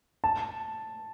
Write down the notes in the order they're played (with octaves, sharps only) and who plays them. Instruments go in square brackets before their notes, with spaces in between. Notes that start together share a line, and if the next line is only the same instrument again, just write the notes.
[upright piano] A5